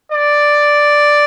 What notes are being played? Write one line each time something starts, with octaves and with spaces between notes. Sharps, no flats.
D5